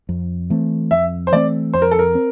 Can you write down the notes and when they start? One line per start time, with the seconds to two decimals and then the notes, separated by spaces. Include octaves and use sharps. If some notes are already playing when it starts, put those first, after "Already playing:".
0.09 F2
0.50 E3 A3 C4
0.91 F2 E5
1.27 C5
1.32 E3 A3 C4 D5
1.74 F2 C5
1.82 A#4
1.91 A4
1.99 A#4
2.15 C4